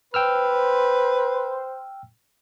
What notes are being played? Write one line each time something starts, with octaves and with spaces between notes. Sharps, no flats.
B4 C5 G5 E6 F6